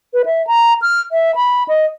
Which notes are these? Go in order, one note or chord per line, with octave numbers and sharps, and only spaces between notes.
B4
E5
A#5
F6
E5
B5
D#5